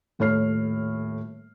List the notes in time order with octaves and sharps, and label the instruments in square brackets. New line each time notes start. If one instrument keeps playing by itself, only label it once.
[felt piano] D#1 A2 C#5 F6 C7